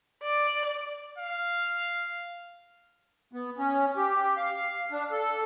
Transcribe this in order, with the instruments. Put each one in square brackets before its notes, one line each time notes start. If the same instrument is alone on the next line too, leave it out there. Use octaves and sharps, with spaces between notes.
[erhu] D5
[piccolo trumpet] F5
[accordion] B3
C#4
G4
F5
D4
A4